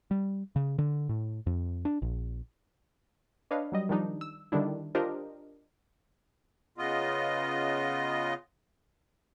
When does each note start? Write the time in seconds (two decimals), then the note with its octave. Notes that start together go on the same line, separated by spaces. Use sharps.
0.11 G3
0.56 C#3
0.79 D3
1.09 A2
1.46 F2
1.85 D4
2.02 A#1
3.51 D4 B4 C#5 D#5 F5
3.72 F#3 G3 D#5
3.89 D#3 F3 G3 D4 D#4
4.21 E6
4.52 D3 D#3 G3 D4 E4
4.95 D4 F4 G4 A#4 C5 D#5
6.78 C#3 B3 F4 D#5